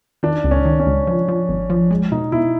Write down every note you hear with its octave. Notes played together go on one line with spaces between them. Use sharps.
D#3 D4
C#2
C#4
D#3
C#4
C#2
F3
F3
G#1
F3
G#3
B2 D#4
B2 E4